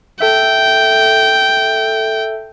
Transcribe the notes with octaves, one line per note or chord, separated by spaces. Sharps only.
A4 E5 G5